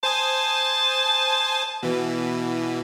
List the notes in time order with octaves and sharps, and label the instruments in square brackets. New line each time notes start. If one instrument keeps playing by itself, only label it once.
[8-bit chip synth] C5 G#5 D#6 [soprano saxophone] A5
[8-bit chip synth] B2 E3